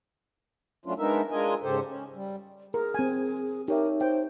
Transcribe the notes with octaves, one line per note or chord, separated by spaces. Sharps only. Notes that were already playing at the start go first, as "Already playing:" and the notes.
F#3 A3 C#4 D4 F4
G#3 B3 D4 D#4 A#4 E5
G#3 D4 F4 A#4 D#5 G#5
G#2 C#3 G4 A4 C5
C#4
G3
G#4 A#4
C4 G#5
D#4 G4 A#4 C#5 E5
C5 G5